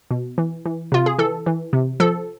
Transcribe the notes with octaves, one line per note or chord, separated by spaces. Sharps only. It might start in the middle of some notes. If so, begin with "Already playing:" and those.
B2
E3
E3
C3 F4
G#4
E3 A4
E3
C3
F3 A4